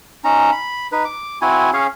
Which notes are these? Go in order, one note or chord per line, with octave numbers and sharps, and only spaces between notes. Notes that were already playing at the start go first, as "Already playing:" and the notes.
C#4 D#4 A#5
B5
D#4 B4
D6
C4 E4 F#4 G#5
C#4 G#4 C#5 F5